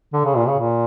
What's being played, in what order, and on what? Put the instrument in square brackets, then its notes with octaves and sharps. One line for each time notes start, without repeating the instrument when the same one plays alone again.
[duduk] D3
C#3
A#2
C#3
A#2